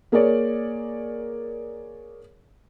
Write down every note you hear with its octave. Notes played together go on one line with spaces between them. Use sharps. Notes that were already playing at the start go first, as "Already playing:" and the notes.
A#3 G#4 A#4 C#5 D5